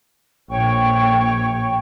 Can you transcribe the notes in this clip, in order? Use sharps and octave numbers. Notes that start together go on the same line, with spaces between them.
A#1 A#2 C#5 G5 C#6